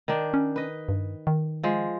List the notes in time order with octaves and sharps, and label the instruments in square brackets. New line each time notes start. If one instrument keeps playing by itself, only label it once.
[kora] D#3 D4
[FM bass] C#4
[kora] B4 D#5
[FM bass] G2
D#3
[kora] F3 G#3